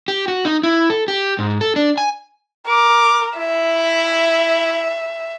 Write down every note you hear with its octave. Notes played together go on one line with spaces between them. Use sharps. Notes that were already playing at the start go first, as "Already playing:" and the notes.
G4
F#4
D#4
E4
A4
G4
G#2
A4
D4
G#5
A#4 D6
E4 E5